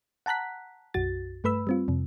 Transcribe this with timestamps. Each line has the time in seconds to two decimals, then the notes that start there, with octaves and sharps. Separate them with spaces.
0.26 F#5 A5 A#5 F#6 B6
0.94 B1 F#2 F#4 A6
1.44 G2 A3 B4 B5 E6
1.67 G3 C4 F4
1.88 F2 C3